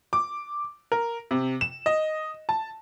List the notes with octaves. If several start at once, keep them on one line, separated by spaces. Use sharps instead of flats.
D6
A#4
C3
E7
D#5
A5